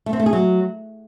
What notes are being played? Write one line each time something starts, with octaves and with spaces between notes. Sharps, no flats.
A3
C4
A3
G#4
F#3